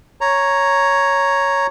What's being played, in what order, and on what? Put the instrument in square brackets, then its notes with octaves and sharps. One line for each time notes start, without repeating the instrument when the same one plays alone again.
[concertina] C#5 A#5